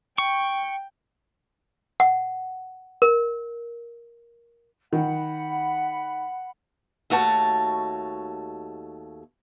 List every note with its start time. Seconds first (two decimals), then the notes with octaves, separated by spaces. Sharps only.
0.18 G5 C#6
2.00 F#5
3.02 A#4
4.93 D#3 F#5 B5
7.10 D#2 A3 F#4 C#5 G#5 A5